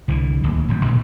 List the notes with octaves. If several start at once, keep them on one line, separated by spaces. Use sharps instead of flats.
C2 D3 E3
D1 D#2
D1 G#1 F#2 F#3
A2 D#3 G#3 A3